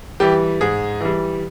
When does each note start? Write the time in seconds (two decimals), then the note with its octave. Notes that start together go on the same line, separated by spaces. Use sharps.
0.20 E3 G3 G4
0.61 G#2 G#4
1.01 E3 G3